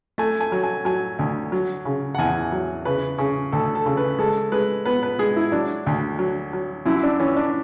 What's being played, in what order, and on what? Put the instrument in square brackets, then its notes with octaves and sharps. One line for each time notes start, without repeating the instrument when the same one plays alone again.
[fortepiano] A3 G#5
G#5
F#3
G#5
F#3 G#5
D2
F#3
C#3
F#5
E2 G#5
F#3
C#3 B4
C#3
D2 A4
A4
C#3
B4
G#3 A4
G#3 B4
B3 B4
B4
G#3 G#4
E4
F#3 D4
D2
F#3
F#3
F#2 E4
D4
E3 C#4
D4